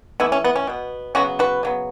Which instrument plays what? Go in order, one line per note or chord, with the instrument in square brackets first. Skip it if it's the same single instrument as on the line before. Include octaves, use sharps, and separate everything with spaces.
[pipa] E3 A3 B3 E4
C#4
B3
C#4
B2 B3
C#3 F#3 B3 C#4 F#4
F#4 B4
C#3 F#3 B3